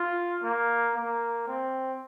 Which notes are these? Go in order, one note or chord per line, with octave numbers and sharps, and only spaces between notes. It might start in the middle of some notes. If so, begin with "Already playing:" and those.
Already playing: F4
A#3
A#3
C4